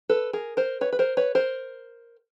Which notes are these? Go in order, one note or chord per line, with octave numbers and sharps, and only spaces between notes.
A4 B4
G#4 A#4
A#4 C5
B4 C#5
B4
A#4 C5
B4 C#5
A#4 C5